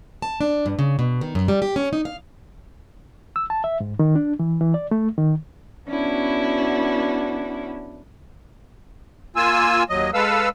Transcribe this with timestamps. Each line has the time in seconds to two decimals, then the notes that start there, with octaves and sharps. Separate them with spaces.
0.22 A5
0.41 D4
0.66 G2
0.79 C#3
0.99 B2
1.21 D#3
1.35 F#2
1.48 G3
1.62 G4
1.76 C#4
1.93 D#4
2.05 F5
3.36 E6
3.50 A5
3.64 E5
3.80 G#2
3.99 D#3
4.16 D4
4.40 E3
4.61 E3
4.74 D5
4.91 A3
5.18 D#3
5.87 B3 C#4 D4 E4 F#4
9.36 A#3 F4 G#5 E6
9.89 D#2 F#3 D#5
10.14 G#3 A4 B4 F5 E6